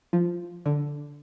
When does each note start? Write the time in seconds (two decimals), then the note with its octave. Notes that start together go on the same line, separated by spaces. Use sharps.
0.13 F3
0.66 D3